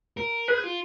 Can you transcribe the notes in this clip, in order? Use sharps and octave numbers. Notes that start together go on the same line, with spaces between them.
A#4
G#4 B4
F4